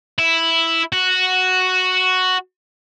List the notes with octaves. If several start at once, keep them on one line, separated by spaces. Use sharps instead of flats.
E4
F#4